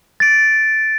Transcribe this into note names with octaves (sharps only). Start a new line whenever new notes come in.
A6 D7